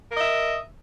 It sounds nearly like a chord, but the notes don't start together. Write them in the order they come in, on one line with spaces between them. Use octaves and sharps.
A#4 D#5 E5